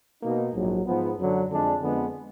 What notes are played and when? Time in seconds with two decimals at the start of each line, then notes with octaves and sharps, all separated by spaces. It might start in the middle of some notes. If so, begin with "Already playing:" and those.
0.23 B2 A#3 D#4
0.54 A#1 G#2 F#3
0.86 G#2 F3 B3
1.17 F#2 D3 F#3
1.49 F2 D3 G#3 D4
1.80 F2 D3 G#3 B3